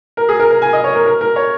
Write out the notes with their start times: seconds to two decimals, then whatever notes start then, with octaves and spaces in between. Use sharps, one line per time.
0.17 A#4
0.29 G#4
0.40 A#4
0.51 A#4
0.62 G#5
0.73 D#5
0.84 C#5
0.95 A#4
1.06 A#4
1.21 A#4
1.36 C#5